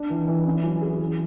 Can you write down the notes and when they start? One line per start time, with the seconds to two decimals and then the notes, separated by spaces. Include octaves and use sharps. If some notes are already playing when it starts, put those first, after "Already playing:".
Already playing: D4
0.10 E3
0.27 E3
0.45 C#4
0.63 F#3
0.82 G#4
0.99 E3